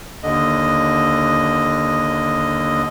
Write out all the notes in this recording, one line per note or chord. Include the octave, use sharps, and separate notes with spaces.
D#2 D3 D#5